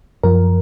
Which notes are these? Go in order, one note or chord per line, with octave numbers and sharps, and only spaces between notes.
F#2 F3 A#4